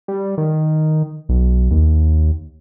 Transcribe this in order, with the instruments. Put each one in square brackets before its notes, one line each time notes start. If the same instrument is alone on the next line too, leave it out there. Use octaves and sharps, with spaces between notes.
[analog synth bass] G3
D#3
B1
D#2